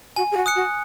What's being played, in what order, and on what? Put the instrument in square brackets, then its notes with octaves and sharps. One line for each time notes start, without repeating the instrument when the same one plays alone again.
[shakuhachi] F#4 [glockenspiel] G#5
[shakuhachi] G#4
F#4
[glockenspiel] D#6 F#6 C#7
[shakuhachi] F#4